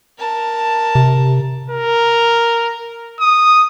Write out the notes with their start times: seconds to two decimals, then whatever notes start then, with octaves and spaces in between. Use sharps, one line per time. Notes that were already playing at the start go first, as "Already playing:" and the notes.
0.19 A#4 A5
0.95 C3
1.70 A#4
3.20 D#6